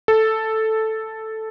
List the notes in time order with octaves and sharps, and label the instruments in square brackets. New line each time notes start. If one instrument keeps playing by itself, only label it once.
[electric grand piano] A4